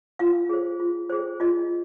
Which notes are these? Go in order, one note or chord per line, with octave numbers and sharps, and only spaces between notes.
F4 F5
G#4 C5
F4
G#4 C5
F4 D#5